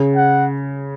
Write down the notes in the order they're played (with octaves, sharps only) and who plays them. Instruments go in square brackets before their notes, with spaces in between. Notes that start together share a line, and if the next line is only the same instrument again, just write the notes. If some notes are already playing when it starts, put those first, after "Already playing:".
Already playing: [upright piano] C#3
[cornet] F#5